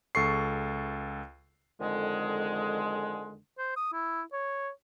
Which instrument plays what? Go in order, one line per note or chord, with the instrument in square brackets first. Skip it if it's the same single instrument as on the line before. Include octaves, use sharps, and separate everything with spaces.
[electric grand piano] C#2 A4 C#6 C7
[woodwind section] F2 D3 D#3 G#3
[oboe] C5
D#6
E4
C#5